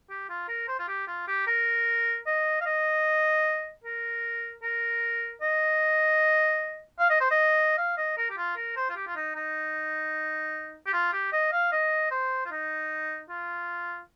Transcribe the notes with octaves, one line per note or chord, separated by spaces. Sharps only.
G4
F4
A#4
C5
F4
G4
F4
G4
A#4
D#5
F5
D#5
A#4
A#4
D#5
F5
D#5
C5
D#5
F5
D#5
A#4
G4
F4
A#4
C5
F4
G4
F4
D#4
D#4
G4
F4
G4
D#5
F5
D#5
C5
F4
D#4
F4